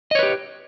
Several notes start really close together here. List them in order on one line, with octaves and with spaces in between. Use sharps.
D#5 C#5 B4 G4